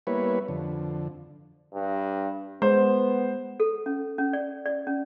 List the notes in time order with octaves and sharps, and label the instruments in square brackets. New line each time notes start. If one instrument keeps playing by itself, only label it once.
[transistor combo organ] G3 A#3 B3 E4 B4 C#5
F2 D3
[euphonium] G2
[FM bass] G#3 [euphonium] B3 [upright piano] C5
[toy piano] A4
C#4
C#4
D5
D5
C#4